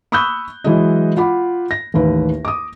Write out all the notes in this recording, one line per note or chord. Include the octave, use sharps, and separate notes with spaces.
B5 C#6 D#6 E6 F#6 G6
E3 F#3 G#3 E4 D#5
F4 F#5 B5 D6
A#6
A1 D#2 B4
D6 D#6